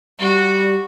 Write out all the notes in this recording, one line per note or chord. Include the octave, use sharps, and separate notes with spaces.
G3 F#4